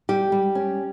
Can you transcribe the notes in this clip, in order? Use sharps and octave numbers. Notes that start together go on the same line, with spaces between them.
G3 G4
G3
C#4